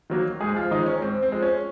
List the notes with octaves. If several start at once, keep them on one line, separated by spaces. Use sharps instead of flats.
D#3 F#3 A#3
G#2 G#3 G#4
F3 F4
D#3 F3 G#3 D#4
C#4
G#2 C4
C4
F3 G#3
C#4